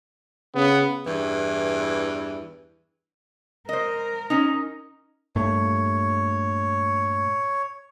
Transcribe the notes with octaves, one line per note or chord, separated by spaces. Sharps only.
C#3 B3
E2 G2 E3
A#4 C5 D#5
C#4 D#4
G2 A#2 A3 C#5